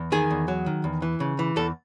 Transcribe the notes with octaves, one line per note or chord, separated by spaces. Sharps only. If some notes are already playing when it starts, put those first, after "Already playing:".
Already playing: E2
D#3 G#4
E2
F#3
D#3
E2
E3
C#3
E3
E2 A4